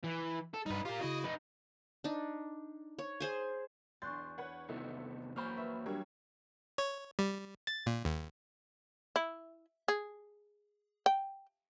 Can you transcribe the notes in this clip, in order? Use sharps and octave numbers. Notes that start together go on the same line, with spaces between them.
E3
A4
G2 G3 D#4 B4
F4 G4 A#4
C#3 E4 F#4 D#5
D#4 B4
D4 D#4
C#5
G#4 C5 G#5
B1 E2 D4 C6 C#6 F#6 G6 A6
B4 C#5 F#5
C3 D#3 B3 D#4 E4 A4
F#2 E3 A#3 C5 B5 C#6 F6
B4 E5 E6
F#3 G3 A#3 D4 G4 C#5
C#5
G3
A6
A#2
D#2
E4
G#4
G5